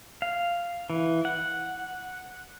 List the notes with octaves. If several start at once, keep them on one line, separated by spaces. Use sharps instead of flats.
F5
E3
F#5